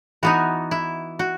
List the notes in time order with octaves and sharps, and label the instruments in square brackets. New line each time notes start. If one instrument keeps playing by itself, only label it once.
[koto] E3 B3 D#4 F#4
E4
F#4